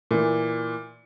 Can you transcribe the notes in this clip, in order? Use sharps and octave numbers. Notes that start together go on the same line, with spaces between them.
A#2 E3